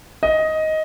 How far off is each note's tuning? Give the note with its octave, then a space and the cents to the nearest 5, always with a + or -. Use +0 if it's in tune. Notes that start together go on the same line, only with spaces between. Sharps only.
D#5 +10